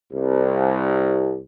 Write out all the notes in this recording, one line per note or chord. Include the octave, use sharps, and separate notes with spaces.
C2